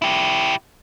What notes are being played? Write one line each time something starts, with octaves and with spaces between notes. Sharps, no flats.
E4 G4